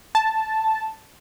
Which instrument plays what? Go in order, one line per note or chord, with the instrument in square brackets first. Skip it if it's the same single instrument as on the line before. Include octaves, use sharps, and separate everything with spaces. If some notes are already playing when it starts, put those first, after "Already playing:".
[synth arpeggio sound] A5